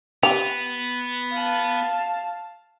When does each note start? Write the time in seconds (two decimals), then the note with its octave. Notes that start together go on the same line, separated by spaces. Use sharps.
0.23 B3 G4 F7
1.32 F5 A5